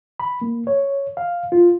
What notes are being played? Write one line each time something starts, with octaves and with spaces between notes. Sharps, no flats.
B5
A#3
C#5
F5
F4